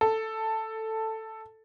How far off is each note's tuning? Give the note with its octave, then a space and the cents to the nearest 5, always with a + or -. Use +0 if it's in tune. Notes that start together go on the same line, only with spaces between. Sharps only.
A4 +5